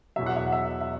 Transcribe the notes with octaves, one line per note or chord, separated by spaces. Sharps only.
E2 B2 F#3 E5
F#5
E5
F#5
E5
E5